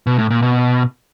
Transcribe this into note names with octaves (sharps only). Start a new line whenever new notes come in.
B2
A2
A#2
B2